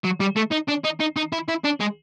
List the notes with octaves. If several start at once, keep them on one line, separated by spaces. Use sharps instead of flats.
F#3
G3
A3
D#4
D4
D#4
D#4
D#4
E4
E4
D4
G#3